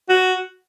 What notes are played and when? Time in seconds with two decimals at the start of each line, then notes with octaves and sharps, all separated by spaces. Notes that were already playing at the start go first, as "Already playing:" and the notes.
0.09 F#4